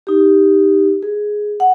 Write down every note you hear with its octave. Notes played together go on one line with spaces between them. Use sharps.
D#4 G4
G#4
F#5